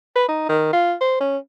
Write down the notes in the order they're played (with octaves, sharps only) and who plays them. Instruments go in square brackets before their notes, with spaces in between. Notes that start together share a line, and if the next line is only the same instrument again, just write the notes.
[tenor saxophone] B4
D#4
D#3
F4
C5
C#4